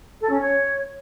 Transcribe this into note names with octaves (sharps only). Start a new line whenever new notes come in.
A4
C#4
C#5